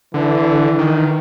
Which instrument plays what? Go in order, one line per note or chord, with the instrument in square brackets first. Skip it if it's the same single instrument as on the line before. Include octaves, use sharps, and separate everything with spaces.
[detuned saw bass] D3 [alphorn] E3
[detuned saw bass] D#3